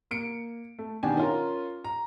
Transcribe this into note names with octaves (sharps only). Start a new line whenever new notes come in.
A#3 C#7 D7
A3
B2 D#3 D4 G4 G#5
C#4 F4 A#4
A#5